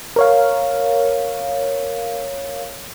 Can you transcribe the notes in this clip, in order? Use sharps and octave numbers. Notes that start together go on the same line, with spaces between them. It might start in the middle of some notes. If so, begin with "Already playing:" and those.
A#4 C#5 F5